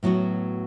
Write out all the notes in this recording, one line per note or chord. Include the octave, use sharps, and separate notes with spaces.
A2 F#3 B3 F#4